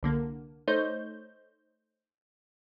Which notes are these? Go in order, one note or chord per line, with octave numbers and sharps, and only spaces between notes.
C2 D3 A#3
A3 D#4 C5 C#5 G6